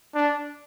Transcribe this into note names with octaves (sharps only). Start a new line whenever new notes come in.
D4